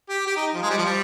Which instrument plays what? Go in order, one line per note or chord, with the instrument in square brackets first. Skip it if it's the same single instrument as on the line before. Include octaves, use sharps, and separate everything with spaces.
[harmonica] G4
G4
D#4
F3
G#3
G3
F3
G3